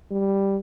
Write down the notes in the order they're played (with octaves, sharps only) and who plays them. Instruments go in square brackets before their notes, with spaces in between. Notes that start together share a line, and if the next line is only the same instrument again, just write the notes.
[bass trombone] G3